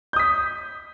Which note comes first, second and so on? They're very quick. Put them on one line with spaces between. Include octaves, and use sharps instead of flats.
G6 D#6 B6